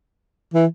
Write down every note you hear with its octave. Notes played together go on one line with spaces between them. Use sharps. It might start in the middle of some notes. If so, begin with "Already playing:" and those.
E3